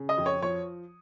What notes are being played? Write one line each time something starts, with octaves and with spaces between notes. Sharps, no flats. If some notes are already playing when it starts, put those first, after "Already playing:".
Already playing: C#3
D#5 D#6
F2
C#5 C#6
F3 C#5 C#6